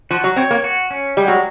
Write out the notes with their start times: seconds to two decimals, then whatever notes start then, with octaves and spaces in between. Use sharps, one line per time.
0.10 F3 F#4
0.24 F#3
0.36 C4 C#5
0.50 A#3
0.64 F#4
0.91 C#4
1.17 G3 G#3
1.28 F#3